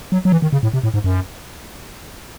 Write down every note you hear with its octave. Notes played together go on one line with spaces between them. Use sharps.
F#3
F#3
E3
D#3
C#3
A2
C3
A2
G#2
F#2